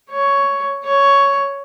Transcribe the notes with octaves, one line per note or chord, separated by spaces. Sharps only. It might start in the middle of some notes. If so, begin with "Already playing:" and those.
C#5
C#5